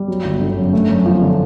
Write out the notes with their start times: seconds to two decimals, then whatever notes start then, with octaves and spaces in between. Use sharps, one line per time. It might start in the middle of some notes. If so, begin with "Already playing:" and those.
Already playing: G3
0.08 F#3
0.25 G1
0.41 D3
0.57 F#2
0.73 A3
0.89 F#2
1.06 F3
1.22 D3